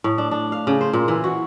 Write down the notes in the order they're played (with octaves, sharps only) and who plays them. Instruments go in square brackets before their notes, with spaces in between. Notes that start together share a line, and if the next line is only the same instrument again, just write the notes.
[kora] A2
D4
D4
F5
C#3
C5
A#2
E3
F#4